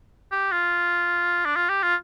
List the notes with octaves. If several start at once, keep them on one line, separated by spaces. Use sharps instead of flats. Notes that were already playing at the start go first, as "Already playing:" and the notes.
G4
F4
D4
F4
G4
F4